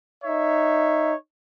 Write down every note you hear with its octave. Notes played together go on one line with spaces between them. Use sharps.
D#4 C#5 E5